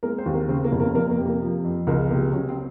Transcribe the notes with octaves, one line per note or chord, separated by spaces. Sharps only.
G#3 A#3 A#4
C4 C5
D#2
A#3 A#4
C#3 C4 C5
A#3 A#4
F1
A#3 A#4
F2 A#3 A#4
A#3 A#4
C3
A#3 A#4
F3
F2
C#2 A#4
G#4
C3 A#3 A#4
F#3 C#4
C4